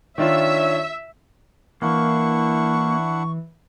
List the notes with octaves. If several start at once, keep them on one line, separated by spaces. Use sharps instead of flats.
D#3 D4 F4 C#5 E5
E3 A#3 D4 E4 F#5 C#6